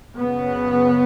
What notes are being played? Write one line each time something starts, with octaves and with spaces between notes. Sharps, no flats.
F#2 C#3 B3